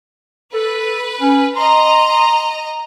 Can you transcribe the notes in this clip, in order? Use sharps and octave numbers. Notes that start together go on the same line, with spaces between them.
A4 B4
C#4
D#5 A#5 C6